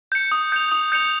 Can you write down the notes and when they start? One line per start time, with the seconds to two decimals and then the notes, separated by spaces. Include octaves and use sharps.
0.12 G6 C#7
0.32 D#6
0.52 G6 C#7 F7
0.72 D#6
0.92 G6 C#7 F7